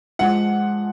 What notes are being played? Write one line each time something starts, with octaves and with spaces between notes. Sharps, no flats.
F3 G#3 D4 F4 F#5